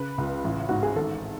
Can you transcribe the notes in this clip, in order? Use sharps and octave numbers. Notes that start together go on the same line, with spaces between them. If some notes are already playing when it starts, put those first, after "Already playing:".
Already playing: C#3 B4
C#2
A1
G#2 F#4
G#4
G#1 A4